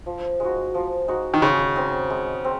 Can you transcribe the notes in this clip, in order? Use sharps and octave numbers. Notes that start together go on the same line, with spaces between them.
F3
G#3 D#4 F#4
F3
G#3 D#4 F#4
D#3
C#3 G#3
C4 D#4
G#3
C4